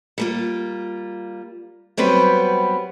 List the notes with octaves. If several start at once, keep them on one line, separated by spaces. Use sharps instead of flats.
G3 A#3 F4
F#3 G3 B3 C4 B4